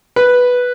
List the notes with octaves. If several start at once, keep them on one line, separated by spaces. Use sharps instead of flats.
B4